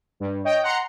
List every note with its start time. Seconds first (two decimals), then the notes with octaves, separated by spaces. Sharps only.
0.20 G2
0.44 C#5 D#5 G5
0.63 F#5 A#5 C6 C#7